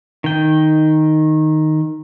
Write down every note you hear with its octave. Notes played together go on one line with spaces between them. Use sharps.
D#3 G5